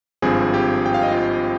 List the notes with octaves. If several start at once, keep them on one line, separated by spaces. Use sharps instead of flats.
G#1 G2 F3 C4 F4 G#4 G#5
G4 G5
G5
F5
D#5
F4 F5